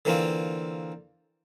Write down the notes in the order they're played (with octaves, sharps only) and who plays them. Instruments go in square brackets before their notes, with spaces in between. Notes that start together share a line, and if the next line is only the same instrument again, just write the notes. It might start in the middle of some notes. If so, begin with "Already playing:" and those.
[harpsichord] D3 E3 A#3 C4 F4